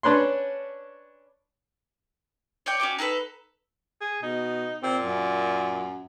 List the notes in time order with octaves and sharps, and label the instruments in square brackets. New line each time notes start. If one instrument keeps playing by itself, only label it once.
[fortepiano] C#4 D4 B4 C#5 C6
[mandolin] C#5 D5 G5
C#4 F#4 G5 D6
D#4 G#4 A4 B4
[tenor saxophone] G#4
[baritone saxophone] B2 [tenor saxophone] D#4
[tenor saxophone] A#2 [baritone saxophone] C4
[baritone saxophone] F#2